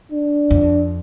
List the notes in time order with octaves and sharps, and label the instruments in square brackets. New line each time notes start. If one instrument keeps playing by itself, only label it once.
[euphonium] D4
[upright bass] F2